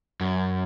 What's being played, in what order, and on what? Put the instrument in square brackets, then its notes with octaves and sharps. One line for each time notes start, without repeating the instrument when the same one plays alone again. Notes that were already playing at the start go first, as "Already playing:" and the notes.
[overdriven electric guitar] F#2